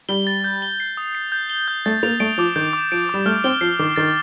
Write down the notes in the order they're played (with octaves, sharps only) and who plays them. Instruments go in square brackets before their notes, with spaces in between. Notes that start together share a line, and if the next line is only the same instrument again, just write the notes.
[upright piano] G3 [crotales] G7
[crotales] A6
G6
G7
C7
D#6
C7
G6
G7
G6
[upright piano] A3 [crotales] A6
[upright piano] A#3 [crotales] F7
[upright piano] A3 [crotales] D7
[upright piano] F3 [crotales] D6
[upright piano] D#3 [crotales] G6
[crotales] D6
[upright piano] F3 [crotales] D7
[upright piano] G3 [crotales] D6
[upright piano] A3 [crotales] F6
[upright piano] C4 [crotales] G7
[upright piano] F3 [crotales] C7
[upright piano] D#3 [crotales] D6
[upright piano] D#3 [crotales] A6